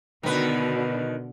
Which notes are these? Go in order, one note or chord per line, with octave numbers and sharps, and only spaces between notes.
B2 D3 D#3 B4